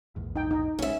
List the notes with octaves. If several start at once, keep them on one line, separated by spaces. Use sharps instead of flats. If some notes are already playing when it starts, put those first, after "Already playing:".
A#1 E2 G#2
D#4 G5
D#4
B1 G#3 C#4 E5